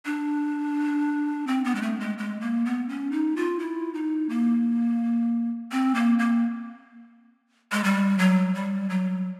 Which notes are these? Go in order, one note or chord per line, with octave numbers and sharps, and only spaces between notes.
D4
C4
B3
G#3
A3
G#3
G#3
A#3
B3
C#4
D#4
F4
E4
D#4
A#3
C4
A#3
A#3
G#3
G3
F#3
G3
F#3